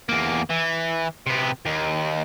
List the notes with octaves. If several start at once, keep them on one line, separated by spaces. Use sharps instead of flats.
E2 A#3
E3
C3 B3
D#2